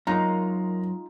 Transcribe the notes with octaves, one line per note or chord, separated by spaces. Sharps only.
F#2 G#3 A#3 D#4 F4 A#5